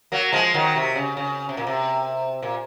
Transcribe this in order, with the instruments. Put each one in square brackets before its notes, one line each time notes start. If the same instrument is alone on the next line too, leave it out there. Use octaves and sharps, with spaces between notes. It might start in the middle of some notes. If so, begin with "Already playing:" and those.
[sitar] F#3 A#3
F3 G#3
D#3 F#3
C3
C#3
C#3
C3
A#2
C3
A#2